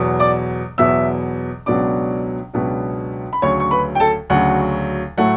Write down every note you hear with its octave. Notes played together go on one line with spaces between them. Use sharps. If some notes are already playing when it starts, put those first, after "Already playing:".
Already playing: E2 B2 F#3 B3
D5 D6
E2 B2 F#3 B3 E5 E6
C#2 B2 F#3 B3 D4 D5 D6
C#2 B2 F#3 B3 D4
B5
D2 C#3 F#3 C#5 C#6
C#6
B4 B5
G5
A4 A5
D2 C#3 F#3 F#5
A2 F#3 A3 F#5